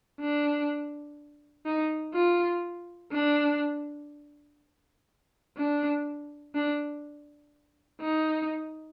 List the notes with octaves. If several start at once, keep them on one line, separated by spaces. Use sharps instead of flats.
D4
D#4
F4
D4
D4
D4
D#4